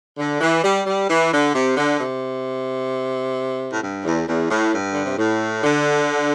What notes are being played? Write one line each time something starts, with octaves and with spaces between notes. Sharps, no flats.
D3
E3
G3
G3
E3
D3
C3
D3
C3
A2
G2
E2
E2
A2
G2
D3
C3
A2
D3